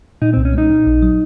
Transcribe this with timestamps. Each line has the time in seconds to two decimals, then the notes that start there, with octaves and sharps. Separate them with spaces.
0.22 A#2 D#4
0.34 C2 C4
0.45 C#4
0.53 G#3 D#4
0.69 A#2
0.86 A#1
1.02 F#3